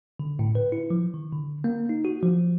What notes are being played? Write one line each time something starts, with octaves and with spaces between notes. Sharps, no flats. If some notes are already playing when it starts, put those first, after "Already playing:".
D3
A2
B4
E4
F3
D#3
D3
A#3
D#4
F#4
F3